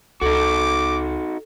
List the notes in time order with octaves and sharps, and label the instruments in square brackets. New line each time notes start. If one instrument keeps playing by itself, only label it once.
[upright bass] C#2 [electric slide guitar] D#4 F#4 [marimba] A4 [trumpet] D6